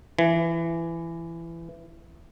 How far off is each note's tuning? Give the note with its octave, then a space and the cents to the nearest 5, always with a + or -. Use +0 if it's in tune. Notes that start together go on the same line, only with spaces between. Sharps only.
E3 +20